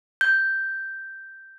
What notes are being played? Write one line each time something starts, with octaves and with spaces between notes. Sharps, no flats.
G6